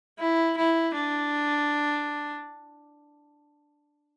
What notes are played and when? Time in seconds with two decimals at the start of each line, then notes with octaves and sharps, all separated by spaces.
0.19 E4
0.57 E4
0.95 D4